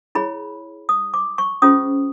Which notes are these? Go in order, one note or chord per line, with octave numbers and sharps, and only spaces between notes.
E4 G#4 C#5 B5
D#6
D6
C#6
C#4 F4 G#4 C5 D#6